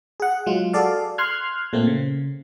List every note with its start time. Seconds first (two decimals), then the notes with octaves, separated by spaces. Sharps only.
0.20 G#4 F#5
0.46 F#3 G#3 F4
0.73 F#4 G#4 A4 D5 F5
1.18 C6 F6 F#6 G#6
1.73 A#2 A3 A#3 C4
1.87 C#3